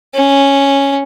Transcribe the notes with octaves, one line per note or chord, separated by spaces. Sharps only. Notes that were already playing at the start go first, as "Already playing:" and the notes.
C#4